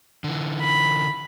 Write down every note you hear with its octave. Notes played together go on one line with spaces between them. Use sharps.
D3 E3
B5